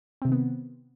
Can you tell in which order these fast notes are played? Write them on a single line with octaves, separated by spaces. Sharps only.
C4 C3 D#3 B3